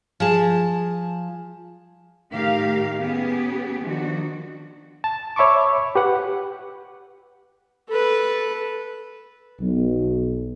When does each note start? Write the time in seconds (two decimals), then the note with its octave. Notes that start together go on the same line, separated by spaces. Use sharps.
0.20 F3 G#4 A5
2.31 A2 D#3 A3 G4 A#4 F5
2.99 B3 C#4 G4 G#4
3.83 D#3 F3 D4 F#4
5.04 A5
5.36 C#5 E5 B5 C#6 D6
5.95 G4 B4 F#5
7.89 A4 B4
9.61 B1